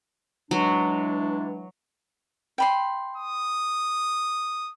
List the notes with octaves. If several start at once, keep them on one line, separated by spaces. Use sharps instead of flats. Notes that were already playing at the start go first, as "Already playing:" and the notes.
E3 F#3 G#3 D4
G5 B5 C6
D#6